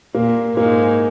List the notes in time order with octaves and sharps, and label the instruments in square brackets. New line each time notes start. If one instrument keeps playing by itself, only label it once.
[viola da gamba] A#2 [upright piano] A#3
[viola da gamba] G#2 [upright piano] A#3